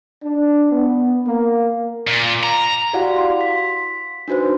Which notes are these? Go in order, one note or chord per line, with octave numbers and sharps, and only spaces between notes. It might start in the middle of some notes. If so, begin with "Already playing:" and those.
D4
B3
A#3
A#2
A#5
E4 F#4 G4 D5 F5 F#5
C6
B6
D4 D#4 F#4 B4 C5